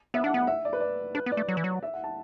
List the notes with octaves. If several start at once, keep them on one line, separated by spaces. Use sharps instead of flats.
B3 E5
D4 F#5
B3 F#5
E5
D5
B4
D5
D4 B4
B3
D5
A3
F#3
E3
F#3
E5
F#5
A5